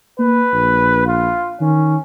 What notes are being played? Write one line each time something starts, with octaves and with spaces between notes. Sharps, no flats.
A#3 B4
A#1
F4
D#3 C#4